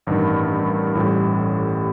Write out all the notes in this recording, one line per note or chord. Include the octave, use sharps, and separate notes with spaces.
A1 G2 D#3
A1 A2 G3